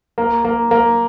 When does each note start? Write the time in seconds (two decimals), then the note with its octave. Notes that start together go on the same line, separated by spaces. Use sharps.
0.18 A#3
0.45 A#3
0.71 A#3